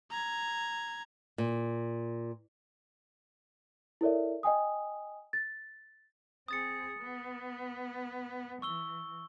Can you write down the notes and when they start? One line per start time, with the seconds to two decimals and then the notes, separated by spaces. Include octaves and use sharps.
0.10 A#5 G#6
1.38 A#2
4.01 E4 A4 A#4 C#5 D5 E5
4.43 D#5 G5 G#5 D#6
5.33 A6
6.48 C4 G#4 D#6 A6 C#7
6.98 B3
8.62 E3 C#6 E6 G7